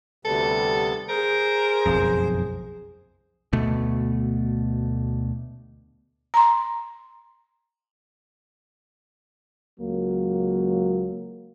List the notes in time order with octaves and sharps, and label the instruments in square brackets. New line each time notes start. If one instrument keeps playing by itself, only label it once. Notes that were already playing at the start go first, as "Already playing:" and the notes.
[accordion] D2 C3 B3 [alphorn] G3 [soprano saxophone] A4
[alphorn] G#4 [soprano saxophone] A#4 [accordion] C5
[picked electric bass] F#1 B1 F2
D2 B2 A3
[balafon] A#5 C6
[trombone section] C#2 F#3 A#3